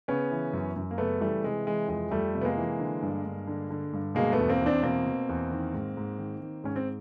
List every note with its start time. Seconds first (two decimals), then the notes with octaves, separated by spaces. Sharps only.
0.08 C#3 B3 C#4
0.31 E3
0.53 F#2
0.76 F#2
0.91 A#3
0.98 C#3 A3 B3
1.21 E3 G3 A3
1.44 C3 G#3
1.67 E3 G#3
1.88 F2 G#3
2.11 F2 G3 A3
2.35 C3
2.41 B3
2.45 G#3 A#3
2.57 E3
2.79 D3
3.02 G2
3.25 G2
3.47 D3
3.70 D3
3.93 G2
4.15 B2 G#3 A#3
4.32 A3 B3
4.38 E2
4.49 A#3 C4
4.61 E2
4.66 C4 D4
4.83 B2 A#3 C4
5.06 B2
5.29 E2
5.52 D#3
5.74 G#2
5.97 G#2
6.18 D#3
6.41 D#3
6.64 G#2 C#4
6.76 C4